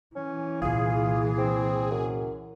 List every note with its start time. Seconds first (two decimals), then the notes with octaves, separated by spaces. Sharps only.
0.16 E3 C#4
0.62 C2 A#2 F4 G#4
1.38 C4
1.91 F#2